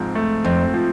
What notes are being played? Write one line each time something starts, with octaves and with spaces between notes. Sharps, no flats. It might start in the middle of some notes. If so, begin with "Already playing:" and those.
Already playing: G#2 F3 C4
A3
F2 C4
F3